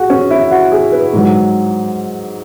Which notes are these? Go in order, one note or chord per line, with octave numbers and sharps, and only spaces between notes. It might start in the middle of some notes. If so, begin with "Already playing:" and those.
Already playing: F#4 G#4
C#4
E4
F#4
G#4
B4
G#2 F#3